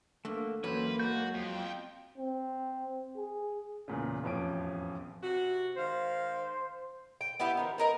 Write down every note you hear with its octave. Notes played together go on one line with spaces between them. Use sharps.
D3 A3 A#3 F#4
E2 F#3 A#3 C#4 B4 C5
F#3 G#3 F#4 G6
F2 G5
C4
G#4
E2 A#2 C#3
E1 A1 F2 F3 C#4 D7
C3 F#4
D#3 G#3 C5 F5
G5
B3 D4 E4 G4
D#3 F3
B3 A#4 D#5